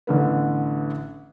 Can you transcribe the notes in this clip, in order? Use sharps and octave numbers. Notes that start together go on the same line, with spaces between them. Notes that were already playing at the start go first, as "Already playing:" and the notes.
A1 D3 B3